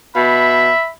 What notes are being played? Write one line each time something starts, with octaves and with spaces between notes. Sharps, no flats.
B2 E5 B5